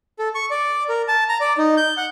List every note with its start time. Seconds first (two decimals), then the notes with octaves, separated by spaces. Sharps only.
0.19 A4
0.35 C#6
0.51 D5
0.89 A#4
1.08 A5
1.29 A#5
1.40 D5
1.58 D#4
1.77 G6
1.97 F#5